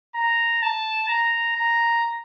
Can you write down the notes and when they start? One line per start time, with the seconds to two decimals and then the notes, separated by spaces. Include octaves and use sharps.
0.15 A#5
0.62 A5
1.08 A#5
1.56 A#5